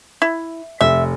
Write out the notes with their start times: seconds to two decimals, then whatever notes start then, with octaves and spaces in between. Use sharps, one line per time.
0.22 E4
0.81 F1 E5